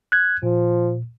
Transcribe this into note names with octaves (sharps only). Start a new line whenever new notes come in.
F#6 G#6
A#2 F3